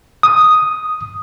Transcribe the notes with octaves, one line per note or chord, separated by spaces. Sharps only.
D#6